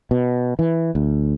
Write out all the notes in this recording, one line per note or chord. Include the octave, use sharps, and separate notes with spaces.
B2
E3
D2